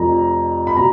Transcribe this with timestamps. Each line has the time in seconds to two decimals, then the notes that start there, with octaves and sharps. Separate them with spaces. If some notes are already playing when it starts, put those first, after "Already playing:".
Already playing: F1 F2 F3 A#5
0.67 B5
0.77 B2 A#5